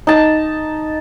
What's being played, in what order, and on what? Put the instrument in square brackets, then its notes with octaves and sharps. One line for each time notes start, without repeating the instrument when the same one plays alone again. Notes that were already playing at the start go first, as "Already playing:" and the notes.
[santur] D#4 A5